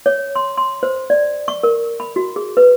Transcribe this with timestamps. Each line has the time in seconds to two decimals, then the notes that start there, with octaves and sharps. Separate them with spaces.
0.06 C#5
0.35 C6
0.58 C6
0.83 C5
1.10 D5
1.48 C#6
1.63 A#4
2.00 B5
2.16 F#4
2.36 G#4
2.57 B4